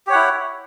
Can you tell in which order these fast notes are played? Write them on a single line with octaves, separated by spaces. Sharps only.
G4 C#5 F#5 E4